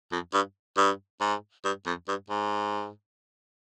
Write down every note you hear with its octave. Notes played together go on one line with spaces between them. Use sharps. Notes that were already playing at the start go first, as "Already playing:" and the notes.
F2
G2
G2
G#2
G2
F2
G2
G#2